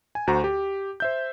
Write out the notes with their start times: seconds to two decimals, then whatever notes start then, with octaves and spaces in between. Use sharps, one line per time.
0.15 G#5
0.27 D2 F#4 C5 A#5
0.44 G4
1.00 C5 E5 G6